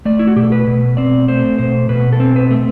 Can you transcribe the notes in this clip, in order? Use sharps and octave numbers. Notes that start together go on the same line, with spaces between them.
A3 D5
E4
F#4
B2 G4
A4
B4
B2
C4 D5
A3 C5
B2 C5
B2 B4
A4
C4
B4
A3